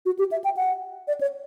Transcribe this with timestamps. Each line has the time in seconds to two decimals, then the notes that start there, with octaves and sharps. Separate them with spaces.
0.06 F#4
0.19 G4
0.32 E5
0.44 G5
0.57 F#5
1.07 D5
1.21 C#5